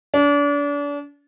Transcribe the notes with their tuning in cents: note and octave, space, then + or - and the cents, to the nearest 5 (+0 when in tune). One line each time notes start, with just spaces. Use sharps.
D4 -35